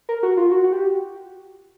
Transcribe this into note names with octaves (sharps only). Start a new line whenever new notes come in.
A#4
F#4
F4
F#4
F#4
G4